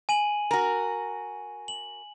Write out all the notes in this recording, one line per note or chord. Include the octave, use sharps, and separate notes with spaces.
G#5 D#7 F#7
F#4 A#4
F#7